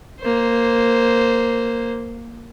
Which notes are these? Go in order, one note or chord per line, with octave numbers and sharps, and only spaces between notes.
A#3 C5